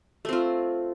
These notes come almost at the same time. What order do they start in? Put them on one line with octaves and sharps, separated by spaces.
A3 C4 F4